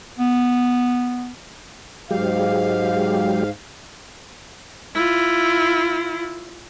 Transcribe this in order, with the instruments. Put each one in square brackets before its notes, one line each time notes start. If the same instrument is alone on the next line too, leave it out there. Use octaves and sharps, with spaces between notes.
[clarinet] B3
[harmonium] G#2 F5 [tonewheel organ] F#3 G#3 G4
[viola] E4 F4